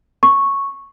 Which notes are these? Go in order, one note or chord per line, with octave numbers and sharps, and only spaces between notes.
C#6